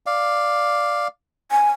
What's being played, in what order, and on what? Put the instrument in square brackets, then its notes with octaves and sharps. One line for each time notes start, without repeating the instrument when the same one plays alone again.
[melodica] D5 F5
[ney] G#5